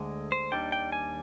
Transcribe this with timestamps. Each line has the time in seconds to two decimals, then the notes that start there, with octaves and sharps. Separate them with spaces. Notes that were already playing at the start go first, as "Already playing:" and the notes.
Already playing: D2 D3 G#3
0.32 C5
0.52 D#2 D#3 G3 D4 G5
0.72 G5
0.92 G#5